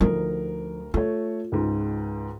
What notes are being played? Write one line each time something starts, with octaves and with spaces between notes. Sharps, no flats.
D2 F3 D#4 A#4
A3 F4 C#5
C#2 G#2